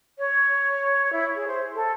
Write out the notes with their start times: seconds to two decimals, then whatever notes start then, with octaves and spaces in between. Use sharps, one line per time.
0.18 C#5
1.12 E4
1.35 G#4
1.47 C5
1.74 A4